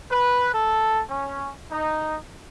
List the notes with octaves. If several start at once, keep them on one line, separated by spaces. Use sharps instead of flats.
B4
A4
C#4
D#4